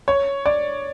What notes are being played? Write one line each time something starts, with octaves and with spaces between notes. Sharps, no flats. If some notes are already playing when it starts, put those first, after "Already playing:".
C#5
D5